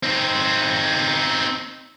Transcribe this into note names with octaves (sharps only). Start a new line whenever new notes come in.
C4 D#4